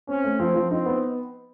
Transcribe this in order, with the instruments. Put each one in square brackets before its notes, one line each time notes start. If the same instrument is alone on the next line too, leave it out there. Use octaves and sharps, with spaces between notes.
[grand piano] C4 [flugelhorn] C#4
[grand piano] A3
[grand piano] F3 [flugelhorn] C4
[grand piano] F3
[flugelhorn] C4 [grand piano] D#4
[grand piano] B3